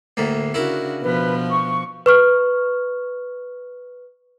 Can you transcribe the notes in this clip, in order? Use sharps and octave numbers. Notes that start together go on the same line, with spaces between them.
D2 A2 A#3
C#3 D4 E4 F#4 A#4
B2 F3 B4
C#6
B4 C#6 F6